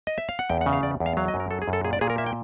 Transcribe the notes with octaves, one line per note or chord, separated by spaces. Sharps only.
D#5
E5
F5
F#5
E2 G5
F#5
C#3
F5
E2 D5
E2
F5
F#3 F5
D#5
F#2
A#4
F#3 A4
G#4
F#2
A4
A#2 G#4
D5
A#2 G#4
A#4
A#3 E5
G5